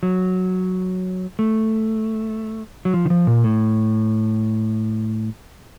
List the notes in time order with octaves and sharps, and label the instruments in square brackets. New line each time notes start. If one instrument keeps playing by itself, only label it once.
[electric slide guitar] F#3
A3
F#3
F3
D#3
F3
A#2
A2